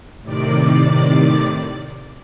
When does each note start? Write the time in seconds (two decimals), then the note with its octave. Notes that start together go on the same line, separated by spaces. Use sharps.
0.22 A2 C3 D#3 D5 D6